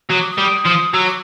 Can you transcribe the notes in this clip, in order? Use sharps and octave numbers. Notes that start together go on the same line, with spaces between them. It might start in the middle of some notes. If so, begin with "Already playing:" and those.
F#3 D#6
D6
D#6
G3
F3
F#3 E6
D6